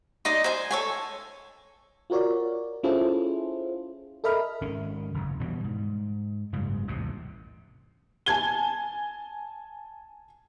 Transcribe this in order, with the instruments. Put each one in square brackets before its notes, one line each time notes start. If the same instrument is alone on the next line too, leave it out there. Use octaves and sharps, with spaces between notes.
[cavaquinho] D#4 D5 D#5 C6
C5 G#5
A4 C#5 G#5
[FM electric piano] F4 F#4 A#4 C#5 D5
C#4 E4 F4 G#4 A4 C5
A4 A#4 D#5 E5 B5 F6
[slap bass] G#1 D#3 C#4
F#1 E2
B2 E3 G3
G#2
F#1 G#2 C#3 G3
A1 D#2 C3
[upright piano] G#5 A5 G#6 G7